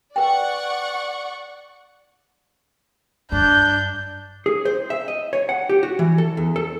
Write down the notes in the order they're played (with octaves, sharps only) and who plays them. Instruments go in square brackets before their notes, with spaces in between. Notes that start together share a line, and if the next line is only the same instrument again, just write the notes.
[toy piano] B4 G5 [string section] D5 F#5 C#6
[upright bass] G2 [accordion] D4 [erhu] G6
[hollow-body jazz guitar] G#4
C5
E5
D#5
C#5
F#5
G4
F#4
E3
A4
E2
A4